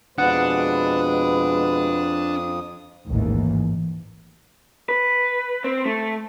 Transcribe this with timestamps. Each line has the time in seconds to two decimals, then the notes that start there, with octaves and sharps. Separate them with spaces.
0.18 F2 B2 G#3 D4 B4 F#5 D#6
3.06 A1 D#2 G#2 E3
4.89 B4
5.64 C4
5.86 A3